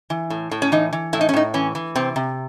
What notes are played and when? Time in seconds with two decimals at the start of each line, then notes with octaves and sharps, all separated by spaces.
0.10 E3
0.30 A2
0.51 A2
0.62 C#4
0.72 E3 D#4
0.93 E3
1.13 A2 E4
1.21 D#4
1.29 C#4
1.34 A2 D#4
1.54 E3 C#4
1.75 E3
1.95 C3 C4
2.16 C3